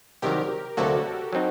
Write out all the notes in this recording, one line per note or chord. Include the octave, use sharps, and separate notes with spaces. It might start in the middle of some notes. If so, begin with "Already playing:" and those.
C2 C3 D#3 F#3 G4 A#4
D2 C3 F#3 A#3 F#4 A4
F#3 C4 D#4